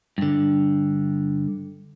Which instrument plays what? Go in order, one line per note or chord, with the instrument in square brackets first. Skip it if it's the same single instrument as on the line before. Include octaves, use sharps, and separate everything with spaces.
[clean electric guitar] G2 D3